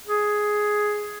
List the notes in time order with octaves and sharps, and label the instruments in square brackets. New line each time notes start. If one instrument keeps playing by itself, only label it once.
[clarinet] G#4